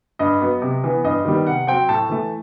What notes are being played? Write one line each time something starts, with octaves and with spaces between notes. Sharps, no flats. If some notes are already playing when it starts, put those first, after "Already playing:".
G2 D#5
F#3 B3
C3
E3 B3
G2 D#5
D#3 G3 B3
C3 F#5
F#3 C4 G5
A2 A5
E3 A3